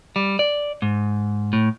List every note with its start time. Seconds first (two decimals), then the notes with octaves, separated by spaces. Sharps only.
0.16 G3
0.39 D5
0.82 G#2
1.53 A2